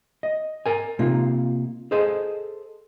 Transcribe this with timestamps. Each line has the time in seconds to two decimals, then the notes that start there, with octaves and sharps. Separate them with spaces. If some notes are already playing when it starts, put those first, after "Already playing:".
0.23 D#5
0.66 A#4 G#5
0.99 C3 A#3 D#4 F4
1.91 G#4 A4 C5 D#5